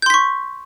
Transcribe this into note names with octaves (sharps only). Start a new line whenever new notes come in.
C6 C#6 G6 B6